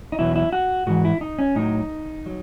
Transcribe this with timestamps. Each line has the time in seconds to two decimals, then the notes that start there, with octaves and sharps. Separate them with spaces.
0.12 D#4
0.19 E2 B2 F#3 E4
0.36 E4
0.52 F#4
0.87 G#2 E3 F#4
1.05 E4
1.21 D#4
1.38 C#4
1.55 A2 F#3 D#4
2.26 F#3